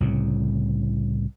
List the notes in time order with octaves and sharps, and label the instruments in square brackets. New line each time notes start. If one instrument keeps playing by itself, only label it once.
[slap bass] C2 A2 C#3